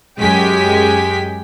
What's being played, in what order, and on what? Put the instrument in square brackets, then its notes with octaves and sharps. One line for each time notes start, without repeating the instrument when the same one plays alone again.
[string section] F#2 G#3 G4 G5 G#5 B6